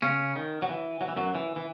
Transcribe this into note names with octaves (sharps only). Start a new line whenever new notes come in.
C#3 C#4
D#3
F#3
E3
F#3
E3
F#2 F#3
E3
E3